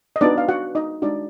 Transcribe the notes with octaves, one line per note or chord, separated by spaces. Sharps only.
D#5
B3 D4 D#4 F#4 D5
F5
F#4 F#5
D#4 D#5
G#3 D4 D#4 F#4 D5